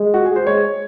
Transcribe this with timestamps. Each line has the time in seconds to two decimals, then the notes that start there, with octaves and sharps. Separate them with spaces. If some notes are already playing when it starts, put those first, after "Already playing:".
Already playing: G#3
0.14 F#4
0.25 G#4
0.36 C5
0.46 G#3 C#5